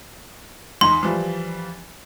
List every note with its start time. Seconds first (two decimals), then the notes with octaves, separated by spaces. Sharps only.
0.81 E2 D#4 C6
1.03 E3 F3 G3